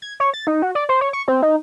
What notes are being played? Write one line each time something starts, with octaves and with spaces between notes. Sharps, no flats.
G#6
C#5
A6
D#4
F#4
D5
C5
C#5
C#6
C4
D#4